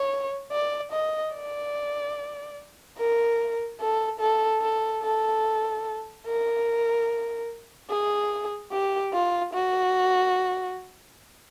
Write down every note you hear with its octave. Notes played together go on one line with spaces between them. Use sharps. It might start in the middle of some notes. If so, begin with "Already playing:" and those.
Already playing: C#5
D5
D#5
D5
A#4
A4
A4
A4
A4
A#4
G#4
G4
F4
F#4